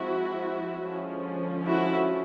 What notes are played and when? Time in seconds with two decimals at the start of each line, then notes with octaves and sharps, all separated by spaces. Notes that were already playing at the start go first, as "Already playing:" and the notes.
Already playing: F3 G#3 C4 E4 F#4
0.86 D3 F3 G#3 C#4
1.66 E4 F#4